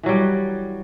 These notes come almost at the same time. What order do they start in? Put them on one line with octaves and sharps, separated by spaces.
E3 F#3 G3